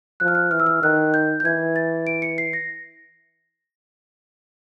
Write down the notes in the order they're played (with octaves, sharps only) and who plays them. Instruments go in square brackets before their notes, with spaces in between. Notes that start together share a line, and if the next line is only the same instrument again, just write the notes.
[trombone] F3 [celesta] F#6
[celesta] F6
F#6
[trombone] E3 [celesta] F6
[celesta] E6
F6
[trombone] D#3 [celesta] F#6
[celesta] G6
G6
[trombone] E3 [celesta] G#6
[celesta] A6
D7
C#7
C7
A#6